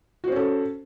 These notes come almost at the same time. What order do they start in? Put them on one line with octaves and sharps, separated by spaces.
F#4 C5 C#4 A4